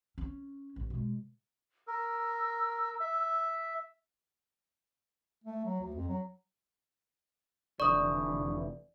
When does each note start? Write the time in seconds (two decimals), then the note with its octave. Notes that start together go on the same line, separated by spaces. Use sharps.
0.18 C#4
0.76 A1
0.90 B2 G#3
1.87 A#4 E6
3.00 E5
5.44 A3
5.65 F#3
5.80 D2
5.95 F2
6.09 F#3
7.80 F1 D3 E3 D5 C#6 D#6